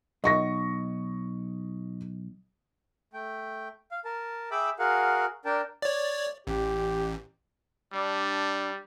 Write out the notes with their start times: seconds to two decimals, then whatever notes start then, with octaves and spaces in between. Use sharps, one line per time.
0.24 B1 D#5 C#6 A#6
3.13 A3 G5
3.91 F5
4.05 A#4 A5
4.51 G#4 E5 G5 B5 D6 E6
4.79 F#4 G#4 A#4 F5 F#5
5.45 D4 A#4 G5 A5
5.82 C#5 D5
6.47 A1 G4
7.93 G3 D4